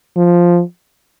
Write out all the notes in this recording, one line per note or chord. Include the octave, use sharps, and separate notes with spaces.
F3